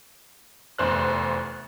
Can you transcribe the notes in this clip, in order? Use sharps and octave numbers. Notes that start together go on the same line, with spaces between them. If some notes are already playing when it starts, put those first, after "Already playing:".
F1 E2 C5 F#6